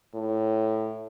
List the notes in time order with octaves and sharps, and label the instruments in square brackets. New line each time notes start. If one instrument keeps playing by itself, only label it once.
[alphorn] A2